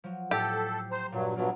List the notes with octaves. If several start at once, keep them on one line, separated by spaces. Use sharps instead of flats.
F3 F#3
A2 G4 A4
B6 C7
C5 A#5 C6
G2 A#2 F#3
G2 B2 F#3 B3 D4 F4